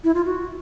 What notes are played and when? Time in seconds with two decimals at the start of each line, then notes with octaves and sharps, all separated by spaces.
0.04 E4
0.15 F4
0.25 F#4